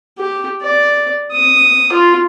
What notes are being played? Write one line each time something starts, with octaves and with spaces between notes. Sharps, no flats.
G4
D5
D#6
F4